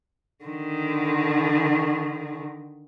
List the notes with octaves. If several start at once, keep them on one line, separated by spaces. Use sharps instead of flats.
D3 D#3